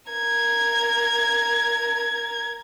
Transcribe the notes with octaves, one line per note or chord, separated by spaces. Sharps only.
A#4 G#6